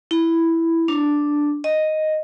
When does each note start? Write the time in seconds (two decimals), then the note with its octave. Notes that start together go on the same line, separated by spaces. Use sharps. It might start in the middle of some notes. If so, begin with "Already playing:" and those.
0.11 E4
0.88 D4
1.64 D#5